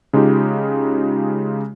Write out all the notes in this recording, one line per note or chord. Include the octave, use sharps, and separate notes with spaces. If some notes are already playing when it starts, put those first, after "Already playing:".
C#3 G#3 D#4 F4 G4